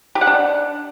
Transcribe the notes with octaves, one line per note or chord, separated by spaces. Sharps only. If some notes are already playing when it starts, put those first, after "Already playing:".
G4
F#5
D4